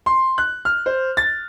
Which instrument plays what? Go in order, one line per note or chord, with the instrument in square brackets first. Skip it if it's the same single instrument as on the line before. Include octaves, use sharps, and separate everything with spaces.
[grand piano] C6
F#6
F6
C5
A6